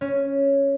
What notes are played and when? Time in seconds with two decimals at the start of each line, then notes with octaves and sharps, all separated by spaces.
0.01 C#4